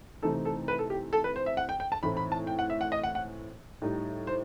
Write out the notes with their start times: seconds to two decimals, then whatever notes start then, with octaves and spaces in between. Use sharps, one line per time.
0.22 C3 E3 A3 C4 D#4 A4
0.45 A4
0.68 B4
0.79 A4
0.90 G4
1.13 A4
1.24 B4
1.36 C5
1.46 E5
1.57 F#5
1.69 G5
1.80 G5
1.92 A5
2.03 A2 E3 A3 C4 D#4 B5
2.17 B5
2.32 A5
2.47 G5
2.59 F#5
2.70 E5
2.81 F#5
2.92 D#5
3.03 F#5
3.15 F#5
3.82 A2 G3 D#4
4.27 C5